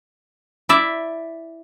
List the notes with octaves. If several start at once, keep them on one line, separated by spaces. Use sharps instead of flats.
E4 D5 E5